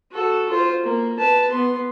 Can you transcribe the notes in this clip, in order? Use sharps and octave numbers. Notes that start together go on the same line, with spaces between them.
F#4 A4
F4 C5
A#3
B4 A5
B3 C6